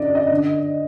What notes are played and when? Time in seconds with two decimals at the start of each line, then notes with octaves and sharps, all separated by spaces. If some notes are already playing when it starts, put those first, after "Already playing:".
Already playing: F#2 D3 D5 D#5
0.15 D#5
0.31 D3